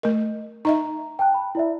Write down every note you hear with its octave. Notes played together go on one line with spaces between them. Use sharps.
A3 A#4 D#5
D#4 D#5 E5 A#5
G5 A5 F#6
B5
E4 D5 E5